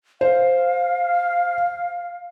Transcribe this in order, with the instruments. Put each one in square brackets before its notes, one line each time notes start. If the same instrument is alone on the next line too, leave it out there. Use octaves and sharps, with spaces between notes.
[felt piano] C5 [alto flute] F5